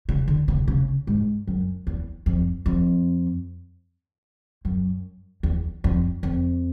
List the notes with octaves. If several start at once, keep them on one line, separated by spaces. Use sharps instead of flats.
C#3
D3
C#3
C#3
G#2
F#2
E2
F2
F2
F#2
E2
F2
F2